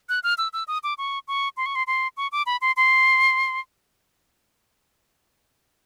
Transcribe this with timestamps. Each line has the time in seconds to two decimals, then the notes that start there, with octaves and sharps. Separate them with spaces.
0.09 F#6
0.23 F6
0.38 E6
0.53 E6
0.68 D#6
0.83 D6
0.98 C#6
1.28 C#6
1.57 C6
1.66 C#6
1.75 C6
1.87 C6
2.17 C#6
2.32 D6
2.46 B5
2.61 C6
2.77 C6